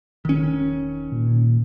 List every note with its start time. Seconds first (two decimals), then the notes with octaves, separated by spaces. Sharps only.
0.25 E1 D#3 C#4
1.12 A#2